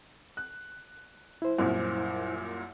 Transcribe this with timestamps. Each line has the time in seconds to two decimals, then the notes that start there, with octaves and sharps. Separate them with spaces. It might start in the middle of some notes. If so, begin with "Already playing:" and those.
0.37 F#6
1.42 E4 C5
1.59 C2 F#2 A#2